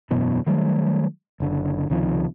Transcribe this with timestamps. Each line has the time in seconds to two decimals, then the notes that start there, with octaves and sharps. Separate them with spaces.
0.11 E1 F#2 B2 E3
0.46 D#3 F#3 G3 A3
1.40 F#1 D3
1.90 C#2 C3 D#3 F3